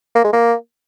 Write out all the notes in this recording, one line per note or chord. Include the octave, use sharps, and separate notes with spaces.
A#3
G#3
A#3